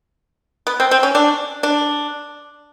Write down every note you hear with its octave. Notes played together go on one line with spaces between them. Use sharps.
B3
C4
C4
C#4
D4
D4